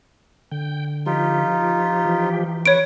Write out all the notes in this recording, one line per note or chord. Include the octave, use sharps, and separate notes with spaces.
D3 G5
F3 D#4 F4 G4
E3
B4 C#5 C#6 D7